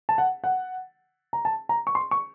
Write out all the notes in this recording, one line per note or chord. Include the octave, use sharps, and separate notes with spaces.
A5
F#5
F#5
A#5
A5
A#5
C#6
C6
C#6